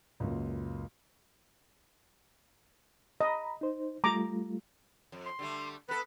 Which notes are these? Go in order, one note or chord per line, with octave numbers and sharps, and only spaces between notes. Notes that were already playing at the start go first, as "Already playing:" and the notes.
C#2 F#2 A#2
D#5 A#5 B5
D#4 C5
G3 A3 F4 A#5 D6
F2
C6
D3 G3 A3
B3 A4 B4